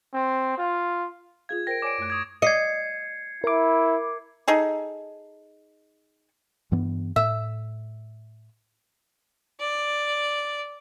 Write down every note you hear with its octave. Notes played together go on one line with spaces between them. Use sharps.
C4
F4
F4 G#4 F5 G#6
A#4 C5 G5 A#6 D7
C#5 D5 G#5 D6 D7
F#2 A3 F#6
C#6 D#6 G#6
D#5 G#6 C7 C#7
E4 A#4 D6
D#4 G#4 A4
G2 E3 B3
A2 E5
D5